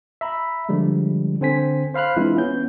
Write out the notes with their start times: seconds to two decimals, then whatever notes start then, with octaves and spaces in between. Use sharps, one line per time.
0.21 E5 A#5 B5
0.69 D3 F3 G3 G#3
1.41 D3 C4 C5 G#5 B6
1.94 C5 F5 B5 F6 F#6
2.17 E3 G#3 C4 D4 E4 F4
2.37 B3 C#4 G6